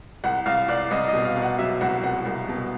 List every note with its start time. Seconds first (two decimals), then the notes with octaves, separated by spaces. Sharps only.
0.24 C2 F#5
0.46 C2 F5
0.69 C2 D5
0.91 C2 D#5
1.08 B2 D#5
1.25 F5
1.36 B2
1.42 F#5
1.59 F#3 E5
1.81 C2 F#5
2.03 C2 F#5
2.26 C2
2.48 B2